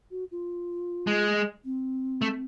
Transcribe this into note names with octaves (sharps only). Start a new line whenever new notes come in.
F#4
F4
G#3
C4
A3